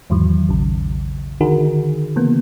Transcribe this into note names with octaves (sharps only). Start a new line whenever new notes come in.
E2 G#2 D#3 E3 F#3
A#1 C#3
D3 D#3 D#4 F#4 G#4 A#4
C#3 E3 A#3 B3